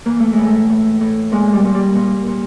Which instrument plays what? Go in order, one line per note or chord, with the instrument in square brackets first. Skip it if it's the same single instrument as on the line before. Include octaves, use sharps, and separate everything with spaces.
[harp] E3 A#3
A3
A2 G#3
A3
A2
A2
A#2 G#3
G3
A#2
G3
A#2
A#2